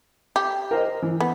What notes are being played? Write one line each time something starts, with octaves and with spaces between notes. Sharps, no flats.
G4
A#4 C5 D#5
E3
B3